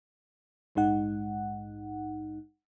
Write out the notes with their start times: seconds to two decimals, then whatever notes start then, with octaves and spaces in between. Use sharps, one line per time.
0.75 A#1 G#2 G#3 D#4 F#5